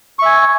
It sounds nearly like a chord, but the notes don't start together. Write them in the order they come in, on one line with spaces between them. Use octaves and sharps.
C#6 E5 G#5